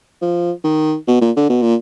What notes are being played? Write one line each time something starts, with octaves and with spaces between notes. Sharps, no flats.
F3
D#3
B2
A#2
D3
B2
A#2